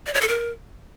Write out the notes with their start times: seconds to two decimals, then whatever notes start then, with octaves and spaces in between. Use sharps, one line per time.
0.07 D5
0.14 C#5
0.21 A4
0.28 A#4